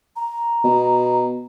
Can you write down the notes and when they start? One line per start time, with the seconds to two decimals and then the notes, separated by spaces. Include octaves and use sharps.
0.16 A#5
0.64 B2